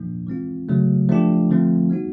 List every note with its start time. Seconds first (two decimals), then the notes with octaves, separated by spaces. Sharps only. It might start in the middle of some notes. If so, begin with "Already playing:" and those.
Already playing: A#2 F3 A#3 D4
0.27 E3 G#3 C4 F4
0.69 C#3 F#3 A3
1.09 F3 A3 D4 G4
1.50 D3 F3 A3 C4
1.90 G3 B3 D#4 F#4